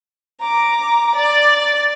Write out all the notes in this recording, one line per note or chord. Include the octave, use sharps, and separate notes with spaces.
A#5 D6
D5